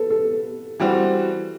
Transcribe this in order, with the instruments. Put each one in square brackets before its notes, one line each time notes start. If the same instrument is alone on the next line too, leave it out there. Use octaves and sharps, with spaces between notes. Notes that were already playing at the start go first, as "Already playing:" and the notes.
Already playing: [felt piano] A4 B4
A4
[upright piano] E3 G3 C4 F#4